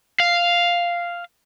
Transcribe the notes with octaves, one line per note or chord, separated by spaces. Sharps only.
F5